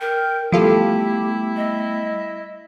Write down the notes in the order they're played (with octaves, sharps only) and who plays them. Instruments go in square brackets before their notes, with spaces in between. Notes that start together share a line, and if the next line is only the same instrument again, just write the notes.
[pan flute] A#4 [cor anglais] G5
[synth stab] F3 F4 A4 [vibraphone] G3 A3 B3 [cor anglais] E4 [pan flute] G4
[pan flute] D#5